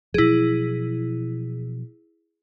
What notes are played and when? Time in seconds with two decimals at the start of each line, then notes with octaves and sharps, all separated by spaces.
0.14 B2 F3 F#3 E4 G#4